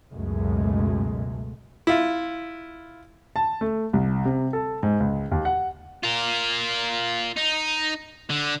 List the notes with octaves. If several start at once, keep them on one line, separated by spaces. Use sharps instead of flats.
C#2 F#2 B2 G#3 A3
E4 F4
A5
A3
C2
C3
A4
G#2
C#2
D#2
F#5
F4 A#4
D#4
D3